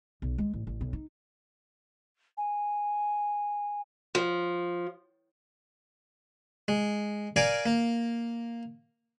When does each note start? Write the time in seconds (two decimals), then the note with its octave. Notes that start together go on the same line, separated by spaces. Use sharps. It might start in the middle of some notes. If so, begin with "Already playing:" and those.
0.22 B1
0.38 G#3
0.54 A1
0.67 A1
0.81 B1
0.93 D#4
2.38 G#5
4.15 F3
6.68 G#3
7.36 A#4 D5 F5 G#5
7.66 A#3